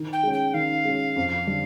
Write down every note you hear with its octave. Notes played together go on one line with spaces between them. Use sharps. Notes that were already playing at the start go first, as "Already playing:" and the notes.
Already playing: D#3
G5
G#3 C#4
G5
D#3 F5
G#3 C#4
F2
D3 G3